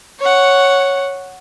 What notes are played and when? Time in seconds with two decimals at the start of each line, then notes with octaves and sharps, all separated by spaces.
0.20 C#5 F#5